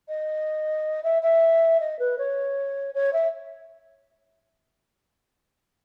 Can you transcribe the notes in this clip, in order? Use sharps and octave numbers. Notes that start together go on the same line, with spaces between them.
D#5
E5
E5
D#5
B4
C#5
C#5
E5